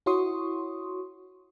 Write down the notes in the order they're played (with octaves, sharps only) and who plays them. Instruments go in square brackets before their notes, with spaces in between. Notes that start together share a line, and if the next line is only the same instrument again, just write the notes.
[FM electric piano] E4 F#4 C#5 C6 C#6 D#6